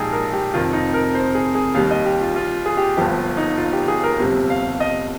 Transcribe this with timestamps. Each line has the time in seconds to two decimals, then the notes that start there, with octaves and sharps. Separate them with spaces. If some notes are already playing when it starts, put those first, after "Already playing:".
Already playing: A#1 G#2 F3 D#4 G4 G#4
0.13 A#4
0.34 G4
0.54 F1 F2 D#3 F4
0.73 D#4
0.94 A#4
1.15 C5
1.35 G#4
1.55 G#4
1.75 D#2 D#3 G3 F5
1.91 D#5
2.06 G4
2.21 F4
2.36 F4
2.66 G#4
2.77 G4
2.97 G1 G2 F3 G4
3.18 F4
3.37 D#4
3.58 F4
3.73 G4
3.88 G#4
4.04 A#4
4.19 G1 F2 C3 G3
4.50 F5
4.80 D#5